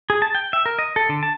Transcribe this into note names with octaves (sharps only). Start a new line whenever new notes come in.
G#4
A5
G5
E5
A#4
D#5
A4
D3
A5